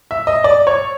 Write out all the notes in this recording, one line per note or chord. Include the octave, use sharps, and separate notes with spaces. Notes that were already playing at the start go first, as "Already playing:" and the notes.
E5
D#5
D5
C#5